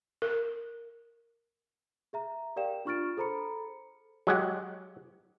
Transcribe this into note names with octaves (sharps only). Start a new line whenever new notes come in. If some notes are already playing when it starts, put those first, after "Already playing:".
A#4
G#4 E5 A#5
G4 A#4 D5 F5 G5 E7
D4 F4 C#6 F6 A6 D7
G#4 A4 C5 A#5 B5 C#7
F#3 G#3 G4 F#5